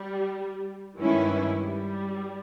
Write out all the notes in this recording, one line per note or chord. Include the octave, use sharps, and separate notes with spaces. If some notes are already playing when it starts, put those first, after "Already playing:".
Already playing: G3
G2 D#3 E3 G#3 C#4 E4
G3